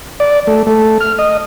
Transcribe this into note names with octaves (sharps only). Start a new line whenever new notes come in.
D5
A3
A3
F6
D#5